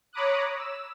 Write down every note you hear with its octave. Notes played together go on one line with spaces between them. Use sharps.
C#5 A#5 B5 D6 D#6 F#6
E6